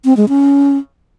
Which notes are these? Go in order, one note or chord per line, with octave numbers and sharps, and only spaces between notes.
C4
G#3
C#4